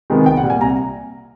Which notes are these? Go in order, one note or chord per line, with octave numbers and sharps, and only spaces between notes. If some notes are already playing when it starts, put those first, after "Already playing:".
C3 D#3 G#3 B3
C2 G5
F#5
A#2 G3
G#5
C2 A#5